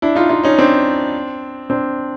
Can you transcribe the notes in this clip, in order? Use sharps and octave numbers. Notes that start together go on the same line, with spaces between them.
D4 E4
D#4 F4
D#4 F4
C#4 D#4
C4 D4
C4 D4